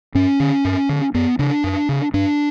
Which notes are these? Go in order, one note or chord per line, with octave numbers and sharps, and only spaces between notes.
G2 C#4
D3
G2
D3
F#2 B3
C#3 D4
F#2
C#3
G2 D4